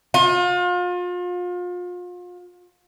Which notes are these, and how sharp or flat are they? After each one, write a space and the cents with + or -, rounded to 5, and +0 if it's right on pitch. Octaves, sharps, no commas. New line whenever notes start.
F4 +35